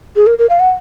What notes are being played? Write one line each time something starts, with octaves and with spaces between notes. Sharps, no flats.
G#4
A#4
A#4
F5
F#5